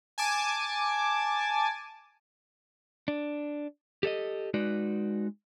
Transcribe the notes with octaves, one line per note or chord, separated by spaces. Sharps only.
G#5 A5 D6
D4
G4 A4 D5 D#5
G#3 D#4 F#4 B4 D5